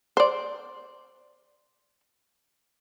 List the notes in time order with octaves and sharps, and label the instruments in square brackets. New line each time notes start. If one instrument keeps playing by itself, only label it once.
[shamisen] C5 D5